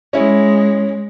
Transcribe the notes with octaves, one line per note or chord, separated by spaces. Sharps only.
G#3 C#4 E4